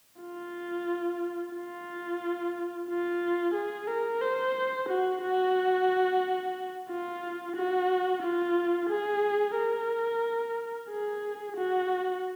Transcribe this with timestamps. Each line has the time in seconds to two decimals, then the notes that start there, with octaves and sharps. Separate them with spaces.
0.21 F4
1.54 F4
2.88 F4
3.54 G#4
3.87 A#4
4.21 C5
4.89 F#4
5.22 F#4
6.89 F4
7.56 F#4
8.23 F4
8.90 G#4
9.56 A#4
10.90 G#4
11.56 F#4